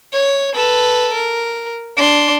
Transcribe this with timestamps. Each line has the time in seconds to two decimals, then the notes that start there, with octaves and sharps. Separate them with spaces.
0.13 C#5
0.54 A4 B4
1.14 A#4
1.97 D4 C6